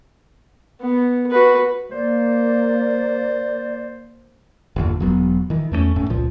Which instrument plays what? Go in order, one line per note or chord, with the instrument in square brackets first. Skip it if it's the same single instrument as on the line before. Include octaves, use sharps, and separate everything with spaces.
[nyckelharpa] B3
F#4 B4
[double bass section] A#3 [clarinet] C5 [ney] D5
[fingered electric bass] G1 E2 A#2 D3
E1 F#3 B3
D#3 E3
E2 A3 A#3 C#4
G1 A2 C#4
C#2 A#2 F3